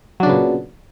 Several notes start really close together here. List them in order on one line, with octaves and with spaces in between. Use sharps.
F#3 D4 C#3 B3 A#2